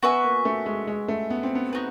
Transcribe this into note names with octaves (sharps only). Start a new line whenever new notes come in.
B3 F#4 B4 E5 G#5
A#3
A3
G#3
G#3
A3
B3
C4
B3
D#4 F#4 B4